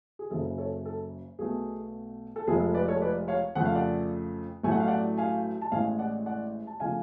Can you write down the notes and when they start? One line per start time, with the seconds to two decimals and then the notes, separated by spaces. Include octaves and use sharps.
0.19 G#4
0.31 F#1 F#2 C#3 A4
0.58 A4 C#5
0.86 A4
1.39 B1 B2 A3 G#4
2.36 A4
2.47 F1 F2 F3 G#3 G#4
2.60 A4
2.74 B4 D5
2.88 A4 C#5
3.01 B4 D5
3.28 C#5 F5
3.55 F2 C#3 F3 A3 F#5
3.65 F5
3.75 D5 F#5
4.63 A1 A2 F#3 A3 G#5
4.72 F#5
4.80 F5
4.88 D5 F#5
5.17 F5 G#5
5.62 A5
5.72 A1 A2 G#3 F5 G#5
5.99 D5 F#5
6.26 D5 F#5
6.67 A5
6.80 C#3 F3 A3 F5 G#5